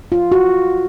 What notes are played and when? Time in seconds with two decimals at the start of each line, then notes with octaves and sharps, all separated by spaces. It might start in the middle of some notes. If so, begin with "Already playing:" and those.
0.12 F4
0.32 F#4